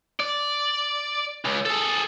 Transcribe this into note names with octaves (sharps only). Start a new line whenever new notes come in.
D5
C#2
G#4 A4